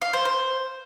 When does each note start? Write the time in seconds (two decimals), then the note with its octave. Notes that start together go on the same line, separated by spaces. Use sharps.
0.02 F5
0.13 C5
0.25 C5